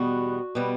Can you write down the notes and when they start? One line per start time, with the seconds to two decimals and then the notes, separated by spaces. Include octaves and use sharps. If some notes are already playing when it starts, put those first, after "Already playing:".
Already playing: E2 B2 G3 B3 F#4
0.55 B2 G3 B3